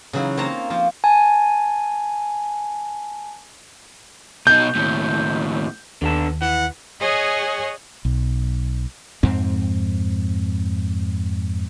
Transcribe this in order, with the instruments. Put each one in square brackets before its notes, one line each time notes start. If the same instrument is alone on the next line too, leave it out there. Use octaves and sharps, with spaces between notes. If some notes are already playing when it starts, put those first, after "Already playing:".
[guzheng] C#3 E3 F#3 D#4 E4
A#3 C4 F4 C#5 A5 A#5
F3 A#3 F4
[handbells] G#5 A5
[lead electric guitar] B2 D#4 [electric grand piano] G6
[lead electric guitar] D#2 A2
[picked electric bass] D#2 [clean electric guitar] D3 B3 A4
[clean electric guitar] E3 [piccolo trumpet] F#5
[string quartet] G#4 C#5 D#5 F#5 G#5
[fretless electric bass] B1
[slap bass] F2 G#2 C4